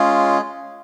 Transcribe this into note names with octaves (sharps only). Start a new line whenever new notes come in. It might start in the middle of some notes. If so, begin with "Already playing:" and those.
Already playing: G#3 C#4 F4 G#4